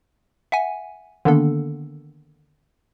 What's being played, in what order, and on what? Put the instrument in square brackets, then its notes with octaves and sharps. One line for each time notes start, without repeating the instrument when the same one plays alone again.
[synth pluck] E5 F#5 G#5
D3 D#3 A#3 B3 D4 A4